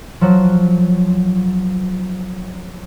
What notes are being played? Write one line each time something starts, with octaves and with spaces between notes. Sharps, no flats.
F3 F#3